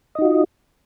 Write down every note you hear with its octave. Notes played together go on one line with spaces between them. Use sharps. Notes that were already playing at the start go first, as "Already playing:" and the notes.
D#4 F4 F#4 D#5